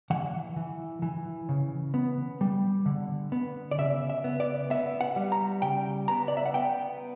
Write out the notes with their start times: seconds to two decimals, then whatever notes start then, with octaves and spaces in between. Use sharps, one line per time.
0.10 E3 F#5
0.56 E3
1.02 E3
1.49 C#3
1.94 B3
2.41 G3
2.86 D3
3.32 B3
3.71 D5
3.78 C#3 E5
4.10 E5
4.24 B3
4.40 D5
4.70 B3 E5
5.01 F#5
5.16 G3
5.32 A#5
5.62 C#3 G5
6.08 B3 A#5
6.28 D5
6.37 E5
6.46 F#5
6.54 B3 G5